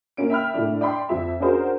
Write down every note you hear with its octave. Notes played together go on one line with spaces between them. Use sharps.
A#3 C#4 D7
E5 G5 B5 F6
A2 A3 D4
D5 G5 B5 C6
F2 E5
C#4 D4 F#4 G#4 A#4 C5